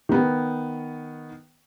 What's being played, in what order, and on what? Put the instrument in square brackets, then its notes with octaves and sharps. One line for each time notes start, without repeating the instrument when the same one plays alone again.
[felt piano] D#3 B3